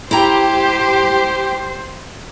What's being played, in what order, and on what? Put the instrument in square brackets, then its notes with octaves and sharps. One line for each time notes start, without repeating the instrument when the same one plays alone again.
[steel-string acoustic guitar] E4 A#5 [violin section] G4 [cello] C5